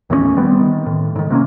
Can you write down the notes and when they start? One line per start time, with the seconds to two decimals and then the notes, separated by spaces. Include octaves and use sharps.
0.10 D#2 A2 A3 C#4
0.37 G3 B3 C4
0.59 D#3
0.86 A2
1.16 G#2 D#3
1.30 C3 A#3 C4 C#4